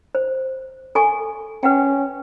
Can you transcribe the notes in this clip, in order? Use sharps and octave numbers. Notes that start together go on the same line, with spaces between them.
C5
A4 G#5 C#6
C#4 B4 F#5 G5